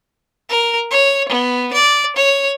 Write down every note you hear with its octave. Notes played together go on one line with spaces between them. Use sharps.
A#4
C#5
B3
D5
C#5